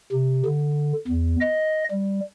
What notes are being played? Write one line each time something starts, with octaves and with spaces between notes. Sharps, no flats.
C3
D3
E2
D#5
G3